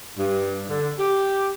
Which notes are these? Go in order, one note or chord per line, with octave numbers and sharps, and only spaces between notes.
G2
D3
G4